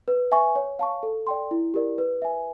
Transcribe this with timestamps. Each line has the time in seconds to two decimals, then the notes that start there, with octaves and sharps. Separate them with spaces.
0.08 B4
0.32 E5 G#5 C#6
0.56 C#5
0.79 F5 A5 C#6
1.03 A4
1.27 D5 G5 C6
1.51 E4
1.74 G4 A#4 D5
1.98 B4
2.22 E5 G#5